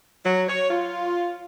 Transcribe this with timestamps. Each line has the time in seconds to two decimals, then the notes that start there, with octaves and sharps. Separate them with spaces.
0.25 F#3
0.48 C#5
0.70 F4